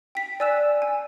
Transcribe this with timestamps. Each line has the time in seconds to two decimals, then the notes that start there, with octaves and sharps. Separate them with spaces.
0.15 G5 B6
0.40 D5 G#5 E6 F#6 E7
0.82 G#5